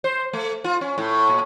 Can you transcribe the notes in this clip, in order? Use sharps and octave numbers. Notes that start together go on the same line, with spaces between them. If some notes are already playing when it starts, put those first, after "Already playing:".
C5
A3
F4
C#4
A2
A#2